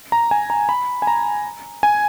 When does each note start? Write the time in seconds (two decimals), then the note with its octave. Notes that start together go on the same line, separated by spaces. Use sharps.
0.12 A#5
0.31 G#5
0.50 A#5
0.69 B5
1.02 G#5
1.07 A#5
1.83 G#5